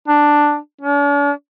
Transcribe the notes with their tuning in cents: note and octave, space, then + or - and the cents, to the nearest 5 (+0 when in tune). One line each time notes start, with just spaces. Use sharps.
D4 +5
D4 -45